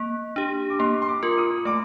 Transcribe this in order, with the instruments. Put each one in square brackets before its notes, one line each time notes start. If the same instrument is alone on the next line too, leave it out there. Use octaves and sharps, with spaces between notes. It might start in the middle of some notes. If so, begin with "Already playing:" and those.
Already playing: [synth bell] A#3
D4 G4
[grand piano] D6
[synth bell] A#3 [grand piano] C6
[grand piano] C6
D6
[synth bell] F4 A#4
[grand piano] D#6
[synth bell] A3 [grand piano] D6